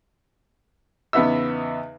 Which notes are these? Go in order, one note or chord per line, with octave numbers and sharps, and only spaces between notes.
E2 C#3 B3 D#4 E5 E6